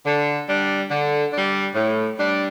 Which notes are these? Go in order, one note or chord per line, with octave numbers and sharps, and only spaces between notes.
D3
G3 D4
D3
G3 D4
A2
G3 D4